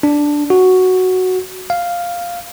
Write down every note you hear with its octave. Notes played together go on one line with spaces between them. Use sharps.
D4
F#4
F5